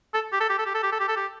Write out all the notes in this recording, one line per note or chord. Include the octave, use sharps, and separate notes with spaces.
A4
G4
A4
G4
A4
G4
A4
G4
A4
G4
A4
G4